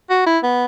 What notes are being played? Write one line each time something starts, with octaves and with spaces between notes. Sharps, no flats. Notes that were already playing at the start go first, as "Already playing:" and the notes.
F#4
E4
B3